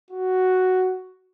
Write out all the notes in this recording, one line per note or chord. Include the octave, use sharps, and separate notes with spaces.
F#4